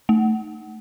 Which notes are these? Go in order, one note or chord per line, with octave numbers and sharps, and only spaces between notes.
A3